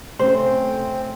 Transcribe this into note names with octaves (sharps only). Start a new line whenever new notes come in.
C3 A3 C4 C#4 C5